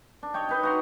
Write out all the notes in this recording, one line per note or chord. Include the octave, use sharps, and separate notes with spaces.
D4
C#5 D#5 G5
D#4 B4 D#5
F#4 A#5 C6